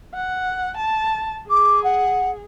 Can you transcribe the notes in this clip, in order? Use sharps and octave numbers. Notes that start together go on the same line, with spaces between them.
F#5
A5
G#4 D6
F#5